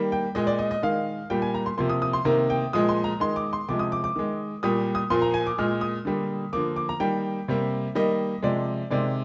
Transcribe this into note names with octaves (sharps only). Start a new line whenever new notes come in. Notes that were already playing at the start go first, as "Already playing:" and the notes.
Already playing: D#3 G3 A#3
G5
A#2 G#3 D#5
D5
D#5
D#5
D#3 G#3 F5
A#2 G3 A#3 G5
G#5
A#5
C6
C3 F3 A#3 C6
D#6
D#6
C6
C3 D#3 A#3 A#5
G5
A#2 F3 G#3 D#6
C6
A#5
D#3 G#3 C6
D6
C6
C3 F3 G#3 D6
D#6
D6
D6
D#3 G#3
A#2 G3 A#3 D#6
D#6
A#2 F3 A#3 C6
A#5
G#5
D6
A#2 G#3 F6
D#6
D3 G3 A#3
D3 F3 A#3 D6
D6
A#5
D#3 G3 A#3 G5
C3 G3 A#3
D#3 G3 A#3 D#5
C3 F3 G#3 D5
C3 D#3 G#3 D5